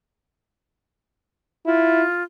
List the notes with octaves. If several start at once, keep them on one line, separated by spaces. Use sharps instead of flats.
E4 F4